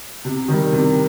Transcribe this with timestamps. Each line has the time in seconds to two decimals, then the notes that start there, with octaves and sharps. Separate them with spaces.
0.25 C3
0.48 D#3 G3
0.72 C3